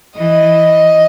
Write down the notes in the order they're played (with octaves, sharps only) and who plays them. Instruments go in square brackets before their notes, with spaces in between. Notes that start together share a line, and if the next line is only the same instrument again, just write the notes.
[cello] E3 [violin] D#5